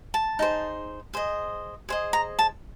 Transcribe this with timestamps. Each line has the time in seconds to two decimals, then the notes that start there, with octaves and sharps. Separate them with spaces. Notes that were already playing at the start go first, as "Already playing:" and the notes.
0.14 A5
0.39 D#4 G#4 C5
1.13 G#4 C5 D#5
1.89 G#4 C5 D#5
2.13 A#5
2.39 A5